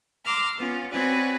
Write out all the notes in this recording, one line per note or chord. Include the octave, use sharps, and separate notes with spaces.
A#5 C6 D6 E6 F6
B3 C#4 F4
C4 F#4 B4 C#5 D5 G#5